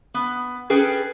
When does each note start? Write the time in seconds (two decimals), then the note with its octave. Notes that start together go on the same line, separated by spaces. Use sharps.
0.14 B3
0.70 C#4 G#4 A4 B4 G5